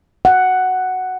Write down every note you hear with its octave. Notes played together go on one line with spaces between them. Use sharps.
F#5